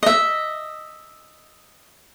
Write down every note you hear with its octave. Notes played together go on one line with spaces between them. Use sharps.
D#5 E5